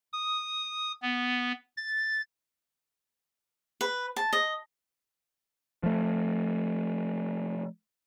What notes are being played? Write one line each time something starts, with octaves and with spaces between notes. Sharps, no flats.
D#6
B3
A6
B4
A5
D#5
F3 A3